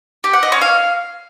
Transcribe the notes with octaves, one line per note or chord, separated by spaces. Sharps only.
G4
F#5
D#5
C#4
F5